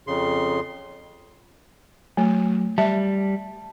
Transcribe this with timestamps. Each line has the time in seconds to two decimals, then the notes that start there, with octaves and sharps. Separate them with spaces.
0.07 F2 C#3 C6
2.17 F#3 A3
2.78 G3 E5 A5